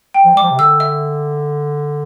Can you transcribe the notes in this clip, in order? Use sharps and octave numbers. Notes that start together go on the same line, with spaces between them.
G5
F3
G3 D6
F3
C3
D3 E6
E5